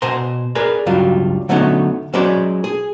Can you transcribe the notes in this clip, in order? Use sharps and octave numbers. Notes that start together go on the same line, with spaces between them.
B2 C5 G#5 A#5 C6
G#4 A#4 B4 D5
C#2 G2 F#3 G3 F4
D3 F#3 A3 B3 C#4 D#4
F#3 G#3 C#4 B4 C5 D5
G#4